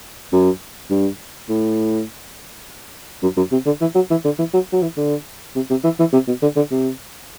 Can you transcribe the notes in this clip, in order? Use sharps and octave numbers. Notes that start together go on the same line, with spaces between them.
F#2
G2
A2
F#2
F#2
C3
D3
E3
F#3
E3
D3
E3
F#3
F#3
E3
D3
C3
C3
E3
E3
C3
B2
D3
D3
C3